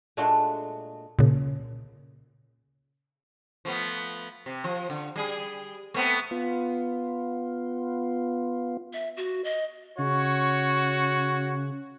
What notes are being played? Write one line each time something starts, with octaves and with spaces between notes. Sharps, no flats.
A#2 G#3 A3 D4 F#4 C6
A#2 C#3
F3 A3 B3
C3
F3
D3
G3 G#4
A3 B3 C4
B3 F4
E5
F#4
D#5
C#3 F#4 C#5